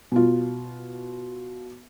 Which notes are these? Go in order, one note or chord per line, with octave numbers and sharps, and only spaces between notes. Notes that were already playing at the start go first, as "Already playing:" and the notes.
B2 F4